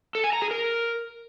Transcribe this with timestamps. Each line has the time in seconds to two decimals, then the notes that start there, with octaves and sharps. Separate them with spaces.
0.15 A4
0.24 G#5
0.33 A#5
0.42 G#4
0.51 A#4